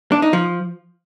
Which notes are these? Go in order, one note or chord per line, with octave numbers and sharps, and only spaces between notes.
D4
D#4
F3